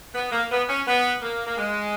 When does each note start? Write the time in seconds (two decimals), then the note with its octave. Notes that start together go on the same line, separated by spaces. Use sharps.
0.15 B3
0.32 A#3
0.50 B3
0.68 C#4
0.86 B3
1.22 A#3
1.46 A#3
1.58 G#3